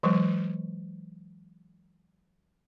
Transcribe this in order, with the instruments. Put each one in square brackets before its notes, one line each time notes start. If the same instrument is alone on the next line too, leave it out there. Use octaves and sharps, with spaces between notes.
[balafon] E3 F#3 G#3